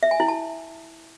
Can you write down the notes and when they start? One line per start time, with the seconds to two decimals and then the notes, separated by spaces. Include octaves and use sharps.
0.03 E5
0.11 G#5
0.20 E4
0.28 A5